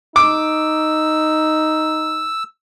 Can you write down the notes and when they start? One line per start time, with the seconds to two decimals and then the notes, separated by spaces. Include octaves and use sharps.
0.16 D#4 D6 E6